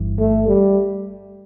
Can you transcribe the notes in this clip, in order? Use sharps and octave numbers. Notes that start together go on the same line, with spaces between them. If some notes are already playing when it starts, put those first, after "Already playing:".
Already playing: G1 G2 E3
A3
G3